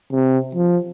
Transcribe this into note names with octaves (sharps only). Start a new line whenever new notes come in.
C3
F3